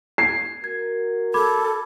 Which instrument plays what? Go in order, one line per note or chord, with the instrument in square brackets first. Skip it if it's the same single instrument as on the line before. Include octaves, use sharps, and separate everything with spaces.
[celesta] G#6 [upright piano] C7
[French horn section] F#4 A#4 [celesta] G#6
[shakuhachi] A4 [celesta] B5 D6 G#6